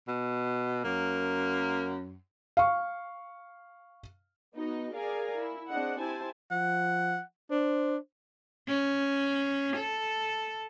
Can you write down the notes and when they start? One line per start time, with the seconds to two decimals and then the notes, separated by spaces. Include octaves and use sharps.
0.08 B2
0.84 F#2 A#3
2.57 F5 C#6
4.55 B3 D#4 F#4 D#5
4.93 G#4 A#4 D5 F5 G#5 A#5
5.37 E4
5.69 C4 D4 G#4 D#5 F#5
5.99 E4 G4 C5 G#5 A5
6.51 F3 F#5
7.51 D4 C5
8.68 C#4
9.76 A4